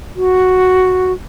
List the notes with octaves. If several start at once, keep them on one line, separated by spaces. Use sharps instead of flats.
F#4